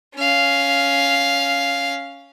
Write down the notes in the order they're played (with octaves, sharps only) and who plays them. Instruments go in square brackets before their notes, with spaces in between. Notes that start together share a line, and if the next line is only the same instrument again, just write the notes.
[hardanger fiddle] C#4 F5